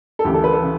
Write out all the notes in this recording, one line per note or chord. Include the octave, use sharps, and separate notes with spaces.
A4
D2 C#3 E3 G4
A4
B4
A4
C#3 E3